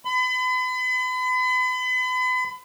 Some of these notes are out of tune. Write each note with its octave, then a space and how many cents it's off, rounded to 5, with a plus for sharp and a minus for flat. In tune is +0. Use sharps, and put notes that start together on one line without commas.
B5 +40